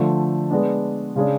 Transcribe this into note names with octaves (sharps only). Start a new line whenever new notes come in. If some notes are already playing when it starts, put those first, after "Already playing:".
Already playing: D3 F3 A3
G#3 B3 D4
C#3 G#3 D4 G#4